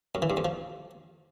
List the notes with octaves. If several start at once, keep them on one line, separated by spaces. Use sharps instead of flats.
F#2
E3
G2
F2
F3